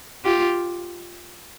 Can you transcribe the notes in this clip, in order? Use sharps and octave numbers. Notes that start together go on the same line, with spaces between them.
F4 G4